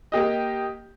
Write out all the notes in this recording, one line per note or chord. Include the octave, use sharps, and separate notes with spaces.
A#3 G4 D#5